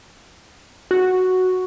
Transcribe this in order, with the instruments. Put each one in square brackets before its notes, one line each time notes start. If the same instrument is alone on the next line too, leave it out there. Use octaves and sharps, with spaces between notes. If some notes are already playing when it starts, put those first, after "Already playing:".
[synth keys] F#4